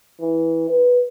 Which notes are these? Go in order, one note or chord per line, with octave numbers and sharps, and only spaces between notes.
E3
B4